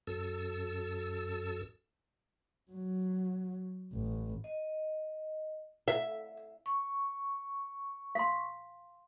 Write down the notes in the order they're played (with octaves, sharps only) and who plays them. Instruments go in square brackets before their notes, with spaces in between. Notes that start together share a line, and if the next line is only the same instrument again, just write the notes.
[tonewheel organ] F#2 A4 E6
[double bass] F#3
A1
[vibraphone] D#5
[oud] E5
[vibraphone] C#6
[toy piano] F5 C6